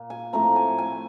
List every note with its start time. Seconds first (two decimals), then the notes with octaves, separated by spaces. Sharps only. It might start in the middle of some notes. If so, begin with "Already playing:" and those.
Already playing: A#2 A#3
0.10 G#5
0.33 A2 F3 A3 C4 A#5
0.56 G#5
0.78 G#5